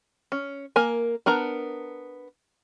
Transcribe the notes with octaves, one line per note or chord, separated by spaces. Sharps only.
C#4
A#3 A#4 G#5
B3 D4 A#4 A#5